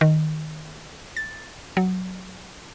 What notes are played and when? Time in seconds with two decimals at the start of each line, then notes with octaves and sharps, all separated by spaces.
0.01 D#3
1.16 A6
1.77 F#3